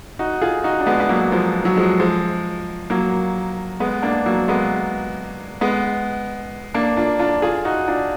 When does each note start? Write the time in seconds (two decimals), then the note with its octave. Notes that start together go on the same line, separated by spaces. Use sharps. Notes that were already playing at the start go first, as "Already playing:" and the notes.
0.19 D#4 F#4
0.42 F4 G#4
0.64 D#4 F#4
0.80 D4
0.86 G#3 B3
1.00 B3
1.09 F#3 A#3
1.32 F3 G#3
1.65 F#3
1.77 F3 G#3
2.00 F3 G#3
2.90 F#3 A#3
3.80 G#3 B3
4.03 A#3 D4
4.26 F#3 A#3
4.48 G#3 B3
5.61 G#3 B3
6.74 A#3 D4
6.97 D4 F4
7.19 D4 F4
7.42 F4 G#4
7.65 D#4 F#4
7.88 D4 F4